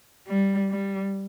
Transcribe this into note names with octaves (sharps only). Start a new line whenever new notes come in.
G3
G3